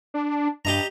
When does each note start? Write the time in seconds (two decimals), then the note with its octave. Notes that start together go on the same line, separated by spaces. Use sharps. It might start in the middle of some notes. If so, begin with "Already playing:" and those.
0.14 D4
0.65 G2 G4 D#5 A#5